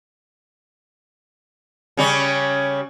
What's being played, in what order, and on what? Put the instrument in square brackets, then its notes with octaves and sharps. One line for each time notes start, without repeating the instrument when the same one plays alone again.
[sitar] C#3 G3 C#4